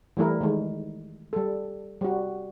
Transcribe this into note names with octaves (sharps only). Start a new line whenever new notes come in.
E3 G3 A3 E4 A#4
D#3 G#3
G3 A4
G3 F#4